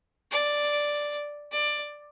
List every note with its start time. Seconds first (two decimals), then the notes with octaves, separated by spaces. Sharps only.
0.32 D5
1.52 D5